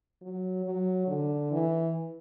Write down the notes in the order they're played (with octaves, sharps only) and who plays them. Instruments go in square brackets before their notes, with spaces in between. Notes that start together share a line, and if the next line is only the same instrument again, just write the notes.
[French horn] F#3
F#3
D3
E3